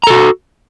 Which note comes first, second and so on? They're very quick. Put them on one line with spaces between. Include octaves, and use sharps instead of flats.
A#5 A4 F#4